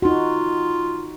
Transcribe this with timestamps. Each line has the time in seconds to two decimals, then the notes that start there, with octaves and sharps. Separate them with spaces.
0.02 D#4 F4 F#4